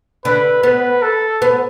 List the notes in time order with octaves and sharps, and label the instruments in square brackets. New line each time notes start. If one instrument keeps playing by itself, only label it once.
[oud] D3 [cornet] B4
[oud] B3 [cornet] B4
[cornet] A4
[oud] B3